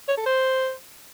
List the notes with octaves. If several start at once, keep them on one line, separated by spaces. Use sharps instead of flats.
C#5
A4
C5